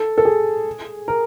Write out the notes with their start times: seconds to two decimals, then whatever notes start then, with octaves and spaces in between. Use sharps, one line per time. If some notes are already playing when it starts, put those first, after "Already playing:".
Already playing: A4
0.18 A4
0.25 G#4
1.08 A#4